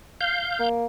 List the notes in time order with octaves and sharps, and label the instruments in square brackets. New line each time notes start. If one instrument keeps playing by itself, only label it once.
[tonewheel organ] F5 G6
[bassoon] A#3